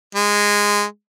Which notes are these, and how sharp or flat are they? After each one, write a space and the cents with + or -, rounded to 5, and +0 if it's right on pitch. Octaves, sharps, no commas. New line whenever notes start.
G#3 -10